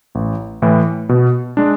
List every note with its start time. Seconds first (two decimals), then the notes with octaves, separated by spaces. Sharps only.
0.15 A1
0.62 A2 E3
1.09 B2
1.57 G#3 D4